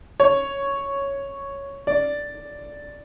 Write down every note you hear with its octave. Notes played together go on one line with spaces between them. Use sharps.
C#5
D5